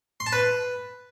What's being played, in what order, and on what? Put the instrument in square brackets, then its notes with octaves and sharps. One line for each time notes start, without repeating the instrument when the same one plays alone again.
[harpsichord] C6
A5
B4